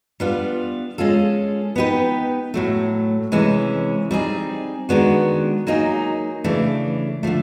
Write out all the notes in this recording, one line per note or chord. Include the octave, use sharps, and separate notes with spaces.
G3 B3 D4 F4
G#3 C#4 F4 A4
B3 D#4 G4 B4
A2 F#3 A3
C3 E3 G#3 C#4 E4
G3 C4 D#4 G#4
D#3 G#3 B3 D4 F#4
F#3 A#3 D#4 G#4
C#3 E3 A3 D4
D3 F3 A3